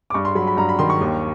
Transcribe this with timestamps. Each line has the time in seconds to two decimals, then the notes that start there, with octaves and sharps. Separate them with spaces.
0.10 D6
0.14 G2 C#6
0.25 C6
0.35 F#3 B5
0.47 B5
0.57 G2 A#5
0.69 B5
0.79 D#3 C6
0.90 C#6
1.01 D#2